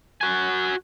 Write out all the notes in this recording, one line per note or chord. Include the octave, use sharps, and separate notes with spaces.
F#4 G#5